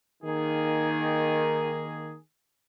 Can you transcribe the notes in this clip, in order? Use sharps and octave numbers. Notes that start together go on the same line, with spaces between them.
D#3 A#3 G#4